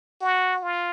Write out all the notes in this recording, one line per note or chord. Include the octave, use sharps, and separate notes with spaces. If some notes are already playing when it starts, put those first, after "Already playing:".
F#4
F4